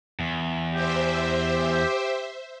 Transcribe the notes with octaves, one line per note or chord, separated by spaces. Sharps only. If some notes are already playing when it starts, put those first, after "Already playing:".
E2
G4 C5 E5